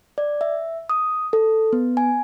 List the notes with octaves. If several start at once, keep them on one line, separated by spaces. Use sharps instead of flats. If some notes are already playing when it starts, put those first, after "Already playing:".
D5
E5
D#6
A4
B3
G#5